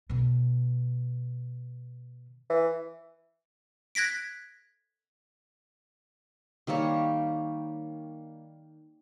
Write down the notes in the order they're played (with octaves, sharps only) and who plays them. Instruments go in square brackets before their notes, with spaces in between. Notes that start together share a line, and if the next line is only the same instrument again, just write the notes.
[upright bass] B2 D3
[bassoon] E3
[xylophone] F#6 G#6 A#6 B6 D7
[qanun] D#3 G3 A#3 C#5